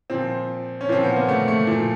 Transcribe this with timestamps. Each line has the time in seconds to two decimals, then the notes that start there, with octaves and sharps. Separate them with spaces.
0.10 A#2 F3 C4
0.81 C#4
0.88 A#2 F3 C4
1.04 B3
1.16 A#3
1.28 A3
1.48 A3
1.67 A#2 F3